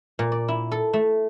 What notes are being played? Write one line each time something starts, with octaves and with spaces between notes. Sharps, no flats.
A#2
D5
E4
A4
A3